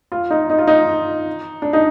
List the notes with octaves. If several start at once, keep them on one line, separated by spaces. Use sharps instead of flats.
F4
D#4
D#4
F4
D#4
D4
D#4